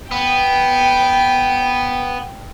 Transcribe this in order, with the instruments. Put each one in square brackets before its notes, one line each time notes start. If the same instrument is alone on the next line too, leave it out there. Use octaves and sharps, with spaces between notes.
[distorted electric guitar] B3 [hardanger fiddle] G5